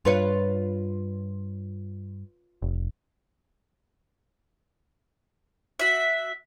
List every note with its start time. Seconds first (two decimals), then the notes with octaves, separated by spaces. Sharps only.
0.05 G2 F4 B4 C#5
2.62 F1
5.79 F#4 E5